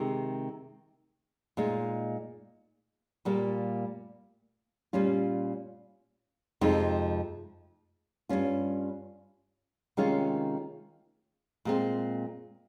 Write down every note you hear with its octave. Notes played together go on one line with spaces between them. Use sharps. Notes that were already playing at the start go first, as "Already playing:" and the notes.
Already playing: C3 D#3 G#3
A#2 G#3 D#4
A#2 G3 A#3
A#2 G3 C#4 F4
F2 C3 F3 G#3 D#4
G2 G3 C#4 F4
C3 D#3 G#3 C#4 F4
A#2 G#3 C4